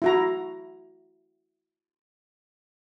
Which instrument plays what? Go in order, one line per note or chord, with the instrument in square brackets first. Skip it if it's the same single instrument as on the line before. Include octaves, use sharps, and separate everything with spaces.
[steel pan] E4 F#4 A#5